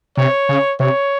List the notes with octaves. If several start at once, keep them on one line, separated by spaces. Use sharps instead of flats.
C3 C#5
C#3
C3 C#5